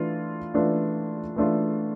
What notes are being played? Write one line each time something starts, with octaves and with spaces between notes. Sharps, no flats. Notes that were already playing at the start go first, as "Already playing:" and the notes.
Already playing: E3 A3 D4 F4
E3 A3 D4 F4
E3 A3 D4 F4